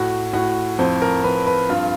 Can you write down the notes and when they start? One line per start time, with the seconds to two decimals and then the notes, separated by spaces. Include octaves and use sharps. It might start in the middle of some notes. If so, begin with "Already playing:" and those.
Already playing: A2 F#4
0.33 A2 F#4
0.79 F2 C5
1.02 A#4
1.24 F2 B4
1.47 B4
1.69 G2 F4